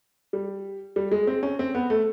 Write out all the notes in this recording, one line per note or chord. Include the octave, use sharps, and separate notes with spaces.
G3
G3
G#3
C4
C#4
C4
B3
A3